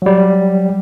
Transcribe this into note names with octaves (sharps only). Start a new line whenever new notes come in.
F#3 G3